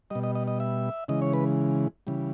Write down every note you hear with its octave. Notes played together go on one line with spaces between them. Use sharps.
B2 G3 D#5
D#5
D#5
D#5
E5
C#3 E3 G#3 D#5
C#5
B4
C#3 E3 G3